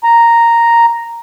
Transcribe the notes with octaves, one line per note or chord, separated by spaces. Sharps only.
A#5